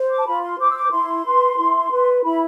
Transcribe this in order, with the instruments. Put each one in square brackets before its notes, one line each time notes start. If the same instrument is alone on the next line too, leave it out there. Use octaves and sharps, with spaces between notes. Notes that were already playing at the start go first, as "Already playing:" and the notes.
Already playing: [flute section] C5
D6
A5
F4 B5
C6
C5 D6
E6
D6
E4 C6
B4
E4
B4
E4 B5